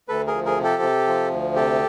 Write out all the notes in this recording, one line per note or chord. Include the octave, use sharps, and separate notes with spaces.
D2 A4 B4
G#4 A#4
F3
G#4 A#4
C3
G4 A4
C3
F3
D2
C3 G4 A4